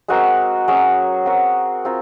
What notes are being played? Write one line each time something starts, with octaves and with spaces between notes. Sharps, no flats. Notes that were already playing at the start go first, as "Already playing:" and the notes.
G#3 C4 F#4 A#4
F#3 C#4 G#4 C#5
C4 F#4 A#4
C4 F4 A#4 F5